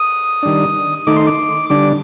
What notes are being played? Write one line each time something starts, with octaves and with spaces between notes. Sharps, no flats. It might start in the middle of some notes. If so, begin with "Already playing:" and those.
Already playing: D#6
D#3 G3 D4
D#3 A3 D#4 D6
C6
D6
D3 G3 D4 D6